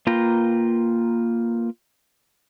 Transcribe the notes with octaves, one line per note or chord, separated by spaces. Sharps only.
A#3 F4 B4 G5 A#5